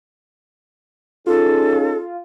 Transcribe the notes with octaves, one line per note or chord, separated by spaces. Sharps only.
C#4 D#4 F4 G#4 A4